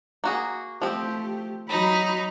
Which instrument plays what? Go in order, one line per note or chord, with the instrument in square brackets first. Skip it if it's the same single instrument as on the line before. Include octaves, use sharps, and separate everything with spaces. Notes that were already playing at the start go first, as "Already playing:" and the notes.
[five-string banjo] A#3 F#4 G#4
[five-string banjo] F3 C4 [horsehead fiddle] A3 G4
[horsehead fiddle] F#3 B5 [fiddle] D#4